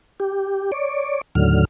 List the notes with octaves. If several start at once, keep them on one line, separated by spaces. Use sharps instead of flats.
G4
C#5 D5
D#2 A2 D3 F#3 F6